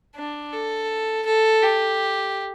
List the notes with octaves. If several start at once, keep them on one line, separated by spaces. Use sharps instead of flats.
D4
A4
A4
G4